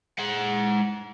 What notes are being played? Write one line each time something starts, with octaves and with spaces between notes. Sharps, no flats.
G#3 F#5